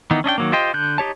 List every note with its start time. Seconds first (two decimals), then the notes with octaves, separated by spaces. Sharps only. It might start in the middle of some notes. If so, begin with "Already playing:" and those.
0.11 D#3 E3 B3 D#4
0.24 C#4 D4 D#5 G5
0.38 D#3 F#3 A#3
0.52 F4 G4 C5 D#5 G5
0.74 D3 F#6 G6
0.98 D#4 G4 C#5 A5